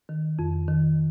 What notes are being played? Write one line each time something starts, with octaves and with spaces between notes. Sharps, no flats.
D#3
F2
D#3